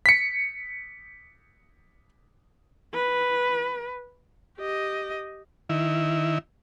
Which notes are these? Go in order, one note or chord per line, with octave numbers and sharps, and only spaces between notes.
B6 C#7
B4
G4 D#5
D#3 E4